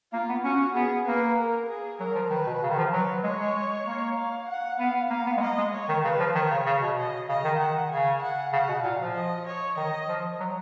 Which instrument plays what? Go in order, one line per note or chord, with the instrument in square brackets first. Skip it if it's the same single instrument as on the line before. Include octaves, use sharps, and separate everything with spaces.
[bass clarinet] A#3 [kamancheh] F4
[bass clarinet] B3
[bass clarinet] C#4 [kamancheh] F#4
[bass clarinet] B3 [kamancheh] G#4
[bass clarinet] A#3 [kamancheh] B4
[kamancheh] A#4
G#4
[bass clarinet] F#3 [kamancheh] A#4
[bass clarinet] F3
[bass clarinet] D#3 [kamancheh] B4
[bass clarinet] B2
C#3
D#3
F3
[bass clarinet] F#3 [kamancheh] B4
[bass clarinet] G#3 [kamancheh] C#5
[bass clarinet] G#3
A#3
[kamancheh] F5
F#5
[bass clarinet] B3 [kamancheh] F5
[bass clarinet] A#3 [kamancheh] F5
[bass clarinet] B3
G#3
[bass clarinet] A#3 [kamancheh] D#5
[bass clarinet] G#3
[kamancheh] C#5
[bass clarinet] D#3
[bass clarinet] C#3 [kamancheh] B4
[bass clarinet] F3
[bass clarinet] D#3 [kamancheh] C#5
[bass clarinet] C#3
C#3
B2
[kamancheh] D#5
[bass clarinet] C#3 [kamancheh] D#5
[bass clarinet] D#3
[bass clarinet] D#3 [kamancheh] F#5
[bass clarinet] C#3 [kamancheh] G#5
[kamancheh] F#5
[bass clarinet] C#3 [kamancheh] F#5
[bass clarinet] B2
[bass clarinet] A#2 [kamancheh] F5
[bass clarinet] F3
[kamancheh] D#5
C#5
[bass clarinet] D#3 [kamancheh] D#5
[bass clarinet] F3
F#3